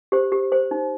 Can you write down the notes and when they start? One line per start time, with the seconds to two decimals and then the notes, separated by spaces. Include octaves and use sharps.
0.12 G4 C5
0.32 G4
0.52 C5
0.71 D#4